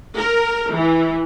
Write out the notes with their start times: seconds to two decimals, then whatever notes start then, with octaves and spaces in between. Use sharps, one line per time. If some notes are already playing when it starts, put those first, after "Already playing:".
0.17 A#4
0.73 E3